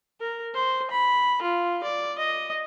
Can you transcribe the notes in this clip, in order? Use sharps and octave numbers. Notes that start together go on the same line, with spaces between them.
A#4
C5
B5
F4
D5
D#5